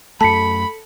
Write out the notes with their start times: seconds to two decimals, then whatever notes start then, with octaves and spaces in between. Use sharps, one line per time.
0.21 F#2 A3 A4 A5 B5 B6 C#7